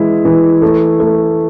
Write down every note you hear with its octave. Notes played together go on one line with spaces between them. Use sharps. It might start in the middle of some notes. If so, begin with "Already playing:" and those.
Already playing: E3 G#3 E4
E3
A3
A3